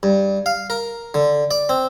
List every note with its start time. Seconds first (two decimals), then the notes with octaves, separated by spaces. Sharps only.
0.03 G2
0.46 F5
0.70 A#4
1.14 D3
1.51 D5
1.69 C4